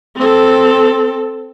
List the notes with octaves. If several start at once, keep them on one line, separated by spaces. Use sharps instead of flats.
C4 A4